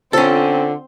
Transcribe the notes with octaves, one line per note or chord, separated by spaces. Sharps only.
D3 C4 C#4 F4 A4 C5